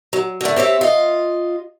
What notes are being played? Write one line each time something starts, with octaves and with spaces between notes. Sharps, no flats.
F#3
D3 A3
C4 G4 C#5 E5
F4 D#5